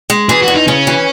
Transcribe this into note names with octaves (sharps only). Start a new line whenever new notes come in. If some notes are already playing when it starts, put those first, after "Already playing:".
G#3
E3 G#4
F#4
E2
D#4
C#3 C#4
E3